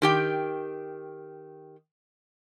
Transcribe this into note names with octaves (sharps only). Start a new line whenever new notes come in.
D#3 G4 G5